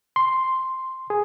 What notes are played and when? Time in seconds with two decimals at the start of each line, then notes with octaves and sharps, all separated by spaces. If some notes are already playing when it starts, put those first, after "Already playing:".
0.16 C6
1.10 G#4